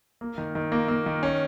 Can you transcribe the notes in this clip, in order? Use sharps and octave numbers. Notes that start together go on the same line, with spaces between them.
A#3
D#3
D#3
A#3
A#3
D#3
C#4